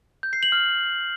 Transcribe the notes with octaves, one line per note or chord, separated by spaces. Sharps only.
G6
C7
F#7
F6